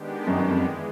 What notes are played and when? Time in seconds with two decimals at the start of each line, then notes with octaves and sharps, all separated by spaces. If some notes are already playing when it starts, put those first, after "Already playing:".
Already playing: D#3 G#3 B3 D4 G4
0.27 F#2
0.38 F#2
0.49 F2
0.60 E3 G#3